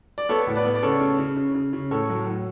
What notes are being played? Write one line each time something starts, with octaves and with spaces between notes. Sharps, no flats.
D5
B3 A4 C#5
A2
B4 D5
B3
D5
C#3 A4 C#5
C#3
C#3
C#3
C#3
C#3
A2 A4 C#5
F#3
A2